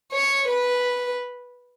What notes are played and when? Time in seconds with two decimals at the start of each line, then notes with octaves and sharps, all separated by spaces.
0.12 C#5
0.47 B4